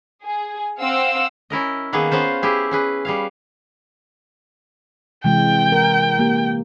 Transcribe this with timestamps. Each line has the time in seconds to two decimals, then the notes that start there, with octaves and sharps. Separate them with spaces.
0.24 G#4
0.80 C4 F5 F#5 E6
1.50 C#4 E4 A#4 D#5
1.93 D#3 A#3 B3 G#4
2.11 B3 C#4 F4 C5
2.43 E4 G4 G#4
2.71 C#4 G#4 B4
3.05 G3 G#4 F5
5.24 C3 E3 G#3 G5
5.72 A#4
6.19 A#3 G4